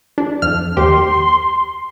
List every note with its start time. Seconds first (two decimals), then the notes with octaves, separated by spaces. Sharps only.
0.18 D4
0.42 F2 F6
0.77 D#2 G4 C6